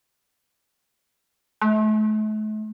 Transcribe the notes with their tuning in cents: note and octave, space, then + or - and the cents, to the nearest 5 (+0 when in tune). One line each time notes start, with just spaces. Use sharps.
A3 -40